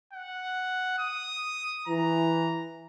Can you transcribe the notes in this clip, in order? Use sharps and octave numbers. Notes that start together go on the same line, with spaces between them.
F#5
D#6
E3 A#5